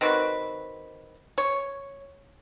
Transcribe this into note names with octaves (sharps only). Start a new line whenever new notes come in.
D#3 C4 F#4 B4
C#5